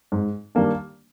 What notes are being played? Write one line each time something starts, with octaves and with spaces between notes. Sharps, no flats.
G#2
D#3 G3 A#3 D4